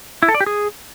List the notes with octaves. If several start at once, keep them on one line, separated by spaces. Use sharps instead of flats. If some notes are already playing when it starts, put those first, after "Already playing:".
E4
A4
D5
G4
G#4